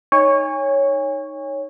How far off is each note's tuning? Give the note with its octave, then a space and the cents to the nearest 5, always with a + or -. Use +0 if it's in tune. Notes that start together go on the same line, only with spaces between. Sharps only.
D#4 +0 C#5 +0 G#5 -35